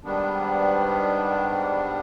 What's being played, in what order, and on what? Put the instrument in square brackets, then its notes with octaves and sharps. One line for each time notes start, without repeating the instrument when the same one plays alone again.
[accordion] G#2 D#3 G3 B3 D4